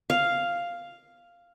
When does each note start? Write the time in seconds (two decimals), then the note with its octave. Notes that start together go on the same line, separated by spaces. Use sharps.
0.10 F5